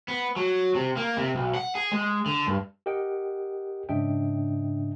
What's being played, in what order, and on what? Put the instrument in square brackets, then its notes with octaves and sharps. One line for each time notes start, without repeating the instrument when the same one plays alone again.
[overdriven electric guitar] B3
F#3
C3
A#3
C3
B1
F#5
G#4
G#3
D3
G2
[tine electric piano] G4 A#4 D#5 F#5 G5
G#2 C#3 D4 D#5 E5 G5